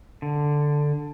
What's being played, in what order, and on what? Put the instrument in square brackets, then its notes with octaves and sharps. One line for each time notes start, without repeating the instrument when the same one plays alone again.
[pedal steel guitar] D3